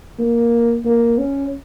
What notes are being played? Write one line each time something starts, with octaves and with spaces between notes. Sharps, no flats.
A#3
A#3
C#4